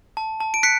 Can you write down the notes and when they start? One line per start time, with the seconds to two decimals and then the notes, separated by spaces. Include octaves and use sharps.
0.17 A5
0.40 A5
0.54 D7
0.63 F#6 B6 C#7